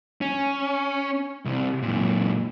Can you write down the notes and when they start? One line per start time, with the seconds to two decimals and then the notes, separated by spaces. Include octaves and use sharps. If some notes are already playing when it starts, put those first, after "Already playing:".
0.21 C#4
1.45 C2 C3
1.83 F#2 A#2